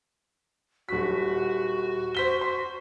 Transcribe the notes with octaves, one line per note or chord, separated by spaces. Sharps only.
D#1 F#4 B6
C5 B6 G7
C6